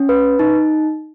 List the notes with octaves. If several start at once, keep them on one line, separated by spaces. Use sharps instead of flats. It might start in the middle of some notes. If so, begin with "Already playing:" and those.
Already playing: C#4
B4
D#4